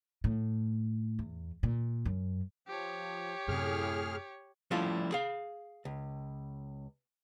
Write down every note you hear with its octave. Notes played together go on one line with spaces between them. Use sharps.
A2
E2
A#2
F#2
F3 G4 C#5
F#2 A2 C3 G#4 F6
F3 G3 A3 C#4 E4 F4
G#4 F5
C#2